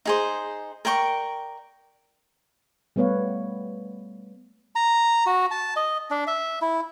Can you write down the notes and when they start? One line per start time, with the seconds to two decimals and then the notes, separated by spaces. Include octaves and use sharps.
0.05 D#4 G#4 C5
0.85 A#4 D5 G5 C#6
2.96 G3 A3 B3 B4 C#5 F5
4.76 A#5
5.26 F#4
5.51 A5
5.76 D#5
6.11 D4
6.27 E5
6.62 E4